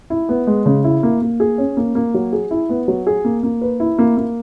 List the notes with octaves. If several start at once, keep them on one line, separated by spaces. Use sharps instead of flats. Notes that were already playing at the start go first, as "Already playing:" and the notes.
E4
B3
G#3
C#3
E4
A#3
A#3
G#4
C#4
A#3
A#3
F#3
G#4
E4
B3
F#3
G#4
A#3
A#3
B4
E4
A#3
A#3